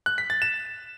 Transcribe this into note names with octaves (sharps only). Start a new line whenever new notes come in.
F#6
B6
A6
E7